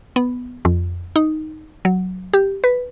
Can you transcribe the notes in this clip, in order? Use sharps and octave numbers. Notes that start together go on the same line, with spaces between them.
B3
F2
D#4
F#3
G4
B4